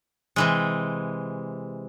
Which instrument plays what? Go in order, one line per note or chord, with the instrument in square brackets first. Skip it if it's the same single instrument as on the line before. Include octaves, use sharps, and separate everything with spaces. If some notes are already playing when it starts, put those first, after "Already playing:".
[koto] C3 E3 G#3